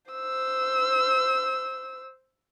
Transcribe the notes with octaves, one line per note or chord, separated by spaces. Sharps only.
C5 E6